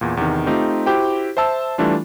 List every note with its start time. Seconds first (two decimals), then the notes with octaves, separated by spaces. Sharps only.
0.01 E2 A#2
0.17 E2 C3 D#3
0.46 A3 C4 D#4 F4 G4
0.86 E4 F#4 G4 C5 G5
1.37 C5 E5 A5 E6
1.78 E3 G3 A3 D4 F4